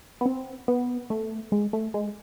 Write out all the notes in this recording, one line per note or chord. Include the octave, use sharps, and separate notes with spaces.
B3
C4
B3
A3
G#3
A3
G#3